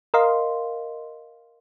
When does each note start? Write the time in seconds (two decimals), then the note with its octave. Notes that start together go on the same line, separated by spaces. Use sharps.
0.14 A#4 D#5 F5 C6